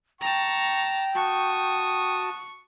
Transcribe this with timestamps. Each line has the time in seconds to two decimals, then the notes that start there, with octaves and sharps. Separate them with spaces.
0.21 G5 A5 A#5 C#6
1.15 F#4 A5 C#6 D#6